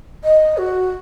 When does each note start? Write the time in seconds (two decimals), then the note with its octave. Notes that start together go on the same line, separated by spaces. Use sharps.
0.24 D#5
0.57 F#4